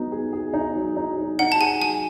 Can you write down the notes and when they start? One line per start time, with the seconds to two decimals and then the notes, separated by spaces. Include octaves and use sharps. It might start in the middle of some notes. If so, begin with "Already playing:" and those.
Already playing: F#3 B3 D#4
0.12 G#4
0.33 G#4
0.54 D#4
0.76 F#3
0.97 D#4
1.18 F#3
1.39 D#4 F#5
1.52 A5
1.60 G#4 G#5
1.81 F#3 G#5